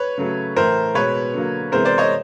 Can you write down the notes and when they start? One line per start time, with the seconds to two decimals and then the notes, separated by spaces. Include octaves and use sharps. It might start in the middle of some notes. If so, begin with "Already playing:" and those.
Already playing: B4 C#5
0.18 C#3 F#3 A3
0.56 A2 E3 A3 A#4 C5
0.94 B2 G#3 B3 B4 C#5
1.34 D3 F#3 A#3
1.72 C3 E3 G#3 B3 A#4 C5
1.85 C5 D5
1.98 C#5 D#5